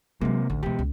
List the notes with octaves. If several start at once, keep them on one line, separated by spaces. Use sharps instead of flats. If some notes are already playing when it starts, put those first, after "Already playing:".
C3 F#3 G#3 A#3
A1 D2
B2 E3 G#3 G4
C#2